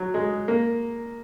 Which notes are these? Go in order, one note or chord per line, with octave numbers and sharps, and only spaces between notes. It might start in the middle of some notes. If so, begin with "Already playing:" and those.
Already playing: F#3
G#3
A#3